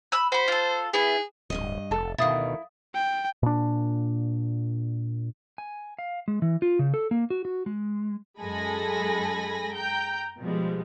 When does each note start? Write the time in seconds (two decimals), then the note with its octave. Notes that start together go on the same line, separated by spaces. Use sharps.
0.12 B5 E6 F#6
0.32 F#4 C5 B5
0.48 F4 A4
0.94 B3 E4 G#4
1.50 D1 G2 B2 D#5
1.91 F1 A4 A5
2.18 D2 B2 D#3 E4 F5 D#6 A6
2.94 G5
3.43 A#2 D4
5.58 G#5
5.98 F5
6.28 G#3
6.42 E3
6.62 F4
6.79 C#3
6.94 A4
7.11 A#3
7.30 F#4
7.45 F#4
7.66 G#3
8.40 F#2 G#3 A4 G#5 B5 A#6
9.74 G5 A#5 G6
10.39 B2 F3 G3 G#3